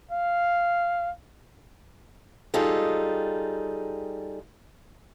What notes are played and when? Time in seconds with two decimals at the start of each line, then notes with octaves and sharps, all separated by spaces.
0.11 F5
2.54 G3 D#4 F4 G#4 A4